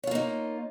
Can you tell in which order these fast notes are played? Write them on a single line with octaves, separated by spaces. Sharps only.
C#5 F4 A#3 D#4